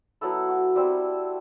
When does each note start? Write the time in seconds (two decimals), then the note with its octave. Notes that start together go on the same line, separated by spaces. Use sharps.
0.21 F#3 B3 E4 A4
0.49 F#4
0.76 G3 C4 E4